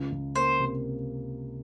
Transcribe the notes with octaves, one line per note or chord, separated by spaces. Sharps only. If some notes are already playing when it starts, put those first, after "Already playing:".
Already playing: C#2
C#2
A#3 C5
C3